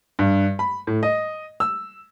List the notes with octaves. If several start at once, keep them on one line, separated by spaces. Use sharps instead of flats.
G2
B5
A2
D#5
E6